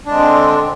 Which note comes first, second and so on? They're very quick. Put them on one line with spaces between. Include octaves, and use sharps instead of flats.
D4 G#3 C4 D3